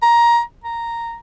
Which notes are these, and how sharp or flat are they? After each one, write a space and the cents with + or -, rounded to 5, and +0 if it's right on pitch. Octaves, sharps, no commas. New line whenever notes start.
A#5 +15
A#5 -5